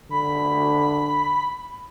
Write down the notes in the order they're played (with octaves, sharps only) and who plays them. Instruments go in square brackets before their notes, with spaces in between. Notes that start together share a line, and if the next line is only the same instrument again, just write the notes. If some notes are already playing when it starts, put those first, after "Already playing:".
[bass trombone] D3 [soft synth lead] B5